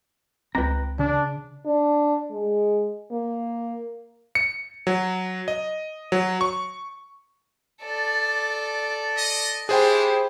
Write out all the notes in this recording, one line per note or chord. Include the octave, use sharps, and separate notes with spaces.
C#2 C4 B4 G5 A#5
C#3 D4
D4
G#3
A#3
C#7
F#3
D#5
F#3
C#6
A4 D5
D#5
D4 E4 G4 G#4 C5 G5